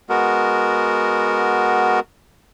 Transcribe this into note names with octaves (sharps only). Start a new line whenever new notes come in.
G#3 B3 F#4 A#4